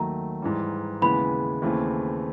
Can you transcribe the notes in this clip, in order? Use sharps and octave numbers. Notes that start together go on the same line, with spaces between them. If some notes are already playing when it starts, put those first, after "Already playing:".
Already playing: D#2 D#3 F#3 A3 A#5
G#2 E3 G3
D#2 C#3 E3 G#3 B3 B5
D#2 C#3 E3 A3 C4